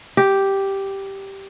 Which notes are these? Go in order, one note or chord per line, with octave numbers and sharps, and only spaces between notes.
G4